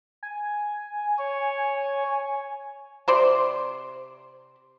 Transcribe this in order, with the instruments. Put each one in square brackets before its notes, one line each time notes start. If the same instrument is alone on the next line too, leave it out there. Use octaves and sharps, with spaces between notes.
[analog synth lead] G#5
[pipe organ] C#5
[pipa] C3 C5 D5